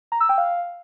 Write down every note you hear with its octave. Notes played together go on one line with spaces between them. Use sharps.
A#5
E6
G5
F5